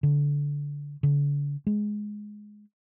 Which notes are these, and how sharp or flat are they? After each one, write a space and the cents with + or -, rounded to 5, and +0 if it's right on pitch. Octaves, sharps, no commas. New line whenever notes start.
D3 -20
D3 -40
G#3 +10